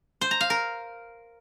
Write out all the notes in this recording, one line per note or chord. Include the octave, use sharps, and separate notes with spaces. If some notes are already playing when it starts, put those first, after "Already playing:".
C5
A#5
F5
A#4